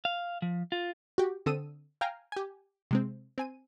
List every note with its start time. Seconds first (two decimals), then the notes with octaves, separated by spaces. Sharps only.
0.05 F5
0.42 F3
0.72 F4
1.18 F#4 G4
1.46 D3 C4 A4 D#6 E6 D#7
2.01 F5 G5 G#5 A#5 F6
2.32 G4 G#5
2.91 C3 G#3 C4
3.38 C4 G#5 D#7